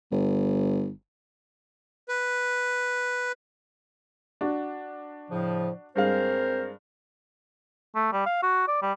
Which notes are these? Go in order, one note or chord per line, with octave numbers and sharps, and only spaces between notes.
G1
B4
D4 F#4
A2 C#3 F3
G2 G#3 C4 A#4 C5 F5
A3
G3
F5
F#4
D5
G3